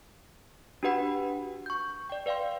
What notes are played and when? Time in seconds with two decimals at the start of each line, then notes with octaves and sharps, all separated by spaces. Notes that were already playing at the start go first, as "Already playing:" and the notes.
0.83 D4 F#4 G4 B4 F#5 B5
1.66 C#6 G6
2.10 D5 G5
2.26 B4 D5 F5 G5 C6